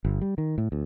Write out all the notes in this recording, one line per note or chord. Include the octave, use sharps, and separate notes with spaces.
G1
G3
D#3
A2
D2